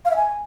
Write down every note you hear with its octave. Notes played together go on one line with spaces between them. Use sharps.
F5
E5
G#5